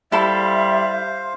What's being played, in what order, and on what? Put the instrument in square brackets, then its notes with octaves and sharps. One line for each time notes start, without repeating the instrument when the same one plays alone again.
[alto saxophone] G3 [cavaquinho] E4 A4 [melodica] C5 F5 [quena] E5